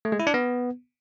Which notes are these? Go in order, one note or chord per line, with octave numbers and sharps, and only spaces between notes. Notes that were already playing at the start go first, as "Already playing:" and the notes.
A3
G#3
E4
D4
B3